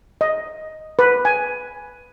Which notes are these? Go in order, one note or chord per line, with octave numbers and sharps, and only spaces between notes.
D#5
B4
G#5